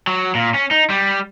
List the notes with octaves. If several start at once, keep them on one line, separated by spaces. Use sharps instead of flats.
F#3
A#2
C#4
D#4
G3